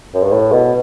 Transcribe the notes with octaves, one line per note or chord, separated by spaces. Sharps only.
F#2
G2
A2
B2